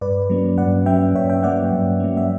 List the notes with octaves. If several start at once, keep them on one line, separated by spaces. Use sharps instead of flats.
G2 B4 D5
F#3 A#3 C#4
G2 D5 F#5
F#3 A#3 C#4 E5 G5
G2 C#5 E5
E5 G5
F#3 A#3 C#4 D5 F#5
G2
F#3 A#3 C#4
E5